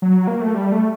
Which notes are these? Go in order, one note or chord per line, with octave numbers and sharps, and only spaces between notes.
F#3
A#3
A3
G3
A3